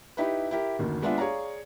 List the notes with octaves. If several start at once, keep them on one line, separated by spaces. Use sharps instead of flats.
D#4 E4 G4 B4
E4 G4 A#4
F#1 D2 D#3
G#3 B3 D4 F4 E5
G#4 C#5 D5 F5 A#5